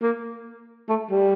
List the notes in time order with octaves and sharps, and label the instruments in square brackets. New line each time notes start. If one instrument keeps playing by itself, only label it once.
[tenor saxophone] A#3
A3
G3